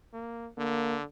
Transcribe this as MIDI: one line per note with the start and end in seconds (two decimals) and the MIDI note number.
0.13 0.48 58
0.57 1.03 50
0.57 0.96 58